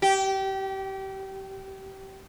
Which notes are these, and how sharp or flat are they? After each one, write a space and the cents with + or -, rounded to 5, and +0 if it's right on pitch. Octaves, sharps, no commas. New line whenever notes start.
G4 -25